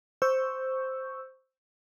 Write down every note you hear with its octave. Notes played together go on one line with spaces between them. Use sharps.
C5 C#6 E6 G6